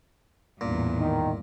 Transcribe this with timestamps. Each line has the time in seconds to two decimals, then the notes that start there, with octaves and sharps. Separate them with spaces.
0.61 A1 E2 G2 A#2
0.98 D#3